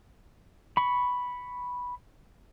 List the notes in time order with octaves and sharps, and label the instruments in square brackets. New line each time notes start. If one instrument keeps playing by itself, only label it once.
[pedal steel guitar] B5 C#6